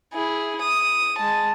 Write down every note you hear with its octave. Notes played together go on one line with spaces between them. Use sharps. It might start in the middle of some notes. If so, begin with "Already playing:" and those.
E4 G#4
D#6
G#3 A5